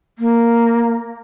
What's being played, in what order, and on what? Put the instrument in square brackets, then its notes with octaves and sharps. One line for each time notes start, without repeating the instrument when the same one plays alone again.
[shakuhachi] A#3